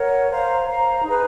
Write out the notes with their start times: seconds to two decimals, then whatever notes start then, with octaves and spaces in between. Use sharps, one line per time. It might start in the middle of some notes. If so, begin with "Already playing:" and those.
Already playing: A#4 C#5 F#5
0.29 C5 F5 A#5
0.67 C5 F5 A#5
1.03 D#4 G#4 B4